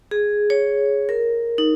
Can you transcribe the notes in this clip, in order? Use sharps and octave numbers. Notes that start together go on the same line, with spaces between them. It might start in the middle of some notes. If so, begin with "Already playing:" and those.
G#4
C#5
A#4
D#4